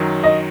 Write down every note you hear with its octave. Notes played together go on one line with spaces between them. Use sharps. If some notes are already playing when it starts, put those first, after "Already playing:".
Already playing: F#2 D#3 F#3
D#5